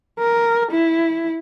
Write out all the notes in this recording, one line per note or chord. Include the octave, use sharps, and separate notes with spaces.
A#4
E4